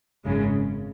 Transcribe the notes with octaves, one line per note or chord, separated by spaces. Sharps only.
G#1 F#2 C#3 G#3